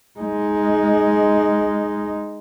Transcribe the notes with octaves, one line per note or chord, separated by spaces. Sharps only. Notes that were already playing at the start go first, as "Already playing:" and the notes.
G#3 D#4